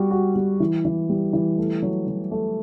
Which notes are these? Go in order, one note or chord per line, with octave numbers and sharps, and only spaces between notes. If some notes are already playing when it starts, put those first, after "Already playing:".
Already playing: G3 F#4
F#4
G3
E3
E3
G3
E3
A3
F#3
F#3
A3